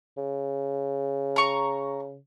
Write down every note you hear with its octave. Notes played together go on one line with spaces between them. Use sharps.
C#3
A#5 C#6